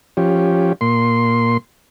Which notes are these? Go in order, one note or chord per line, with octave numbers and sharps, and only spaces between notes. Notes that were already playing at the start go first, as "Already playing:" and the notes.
F3 C#4 G4
A#2 C6